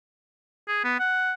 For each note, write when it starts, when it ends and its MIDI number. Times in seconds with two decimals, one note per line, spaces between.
0.68 0.84 68
0.84 0.95 59
0.99 1.33 78